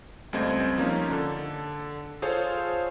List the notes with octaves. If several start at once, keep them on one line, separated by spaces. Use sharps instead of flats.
C#2 G3 A3 C4 D#5 G#6
F3 A#3 C#4 D#4
D3 A4
F4 G#4 A4 C5 C#5 F5